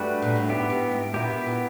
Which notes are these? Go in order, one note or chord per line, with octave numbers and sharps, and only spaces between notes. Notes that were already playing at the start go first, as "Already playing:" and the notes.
Already playing: G2 A3 D4 F#4 B4
A#2
A2
G#2 B3 E4 G4
G2
G#2
A#2 B3 E4 G4
B2
A#2